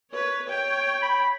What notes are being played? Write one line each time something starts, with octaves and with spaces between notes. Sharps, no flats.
B4 C#5
C#5 G5
B5